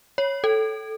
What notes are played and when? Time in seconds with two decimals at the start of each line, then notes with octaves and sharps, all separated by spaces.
0.18 C#5
0.44 A4